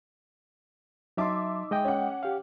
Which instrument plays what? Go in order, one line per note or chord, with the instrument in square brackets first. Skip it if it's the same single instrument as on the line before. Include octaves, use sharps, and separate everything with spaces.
[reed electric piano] F#3 A5 C6 [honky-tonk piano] D#4 E5 D6
[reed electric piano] G#3 D#5 G5
[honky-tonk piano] C#4 F#5
[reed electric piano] G4 F5